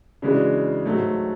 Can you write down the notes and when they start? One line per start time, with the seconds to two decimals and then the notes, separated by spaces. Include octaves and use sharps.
0.22 C#3 E3 G#3 D4 F#4
0.86 G#2 F#3 A3